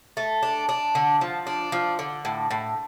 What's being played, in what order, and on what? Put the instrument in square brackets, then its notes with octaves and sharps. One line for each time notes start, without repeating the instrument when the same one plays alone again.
[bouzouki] A3
D4
D4
D3
F3
D4
F3
D3
A2
A2